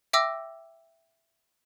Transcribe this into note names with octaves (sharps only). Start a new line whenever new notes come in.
E5 G5 D6 E6 A#6